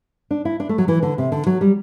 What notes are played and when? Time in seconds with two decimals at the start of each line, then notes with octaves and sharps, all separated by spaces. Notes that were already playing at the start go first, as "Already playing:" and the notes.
0.31 D4
0.45 E4
0.60 D4
0.69 A3
0.78 F#3
0.88 E3
1.03 D3
1.18 C3
1.32 D3
1.46 F#3
1.61 G3